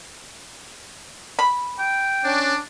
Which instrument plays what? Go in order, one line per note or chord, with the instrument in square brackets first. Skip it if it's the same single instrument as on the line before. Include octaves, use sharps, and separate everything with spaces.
[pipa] B5
[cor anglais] G5
[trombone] C#4 [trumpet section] D4